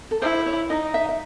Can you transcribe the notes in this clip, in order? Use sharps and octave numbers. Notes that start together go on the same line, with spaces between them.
A4
E4 C5
C#5
D#4 D#5
E5
E5